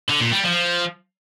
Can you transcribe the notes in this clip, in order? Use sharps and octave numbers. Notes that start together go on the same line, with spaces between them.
D3
A#2
G3
F3